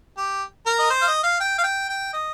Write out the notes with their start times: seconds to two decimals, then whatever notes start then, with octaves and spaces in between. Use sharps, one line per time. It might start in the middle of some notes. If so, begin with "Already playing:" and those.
0.17 G4
0.66 A#4
0.79 D#5
0.90 C5
1.02 F5
1.07 D#5
1.23 F5
1.40 G5
1.58 F5
1.63 G5
1.89 G5
2.13 D#5